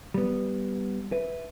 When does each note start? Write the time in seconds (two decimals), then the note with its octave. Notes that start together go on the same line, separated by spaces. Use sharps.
0.14 G3 B3
1.12 B4 E5